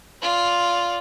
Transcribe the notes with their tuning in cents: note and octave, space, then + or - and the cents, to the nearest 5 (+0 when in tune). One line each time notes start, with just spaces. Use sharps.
F4 +0 D5 -20